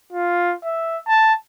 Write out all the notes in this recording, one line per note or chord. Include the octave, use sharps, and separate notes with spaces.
F4
E5
A5